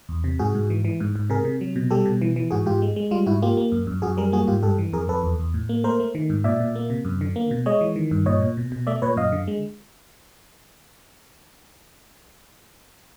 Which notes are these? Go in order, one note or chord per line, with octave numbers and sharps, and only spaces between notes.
E2
C3
G#2 F#4 G#4
G#2
E3
E3
G#2
G#2
C3 G#4 A#4
C3
F#3
B2
G3 G4 A4
B2
E3
E3
G#2 F#4 G#4
G#2 F4 G4
G#3
G#3
G3 F4
G#2 E4 F#4
A#3 F4 G4
A#3
F#2
F#2
F#2 F#4 G#4
G3 G#4 A#4
A#3 F#4 G#4
G#2 F4 G4
G2 G4 A4
E3
F2 G#4 A#4
F2 A4 B4
E2
E2
A2
A#3
A3 A#4 C5
A3
D#3
G#2
A#2 D5 E5
A#2
A#3
C3
F#2
D3
A#3
B2
G#3 C#5 D#5
E3
D#3
G2
A#2 C#5 D#5
A#2
B2
B2
A3 D5 E5
A#2 B4 C#5
F#2 D#5 F5
D3
G#3